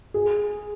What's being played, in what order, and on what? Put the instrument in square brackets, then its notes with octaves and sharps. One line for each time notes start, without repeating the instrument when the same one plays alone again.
[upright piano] G#4